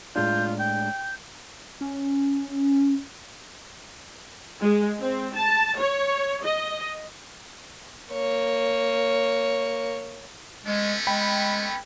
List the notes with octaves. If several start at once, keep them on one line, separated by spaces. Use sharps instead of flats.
A2 G#3 D4 F4 G6
G5 G6
C#4
G#3
C4
A5
C#5
D#5
A#3 C#5
G#3 A3 B3 C#4
G#3 G5 B5